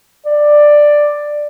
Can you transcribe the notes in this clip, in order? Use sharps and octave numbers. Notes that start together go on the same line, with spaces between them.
D5